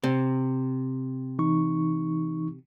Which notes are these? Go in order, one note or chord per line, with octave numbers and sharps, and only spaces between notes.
C3
E3 D#4 C#6